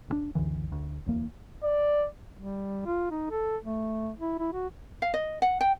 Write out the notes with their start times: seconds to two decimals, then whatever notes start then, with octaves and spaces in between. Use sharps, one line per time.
0.08 D#1 A#2 D4
0.35 C#2 F#2 D3 E3
0.72 D2
1.06 D1 E2 A#3
1.64 D5
2.36 G3
2.86 F4
3.11 D#4
3.30 A4
3.65 A3
4.18 E4
4.39 E4
4.53 F#4
5.02 F5
5.14 D#5
5.42 F#5
5.61 G5